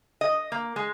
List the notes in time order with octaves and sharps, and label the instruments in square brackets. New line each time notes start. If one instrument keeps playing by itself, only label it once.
[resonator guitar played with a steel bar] D#5
A#3
G#3